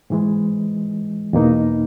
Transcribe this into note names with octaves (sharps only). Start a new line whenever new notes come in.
G#2 E3 G#3
E2 B2 A#3 D#4